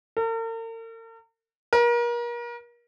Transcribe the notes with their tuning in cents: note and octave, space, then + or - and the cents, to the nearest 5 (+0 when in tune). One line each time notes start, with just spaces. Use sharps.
A#4 -45
A#4 +35